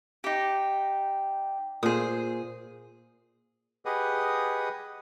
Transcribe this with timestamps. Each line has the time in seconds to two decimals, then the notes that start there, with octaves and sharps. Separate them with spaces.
0.24 D#4 G4
1.83 A#2 G#4 C5 D#6
3.85 G4 G#4 B4 D#5 F#5 D#6